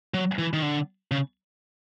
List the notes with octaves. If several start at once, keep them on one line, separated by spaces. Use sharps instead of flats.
F#3
E3
D#3
D3
C#3